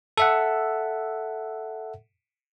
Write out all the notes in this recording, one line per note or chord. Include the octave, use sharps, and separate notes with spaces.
A4 E5 F#5